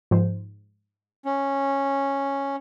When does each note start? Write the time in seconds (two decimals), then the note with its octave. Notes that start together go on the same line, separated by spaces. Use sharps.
0.11 G#2 F3 C5
1.25 C#4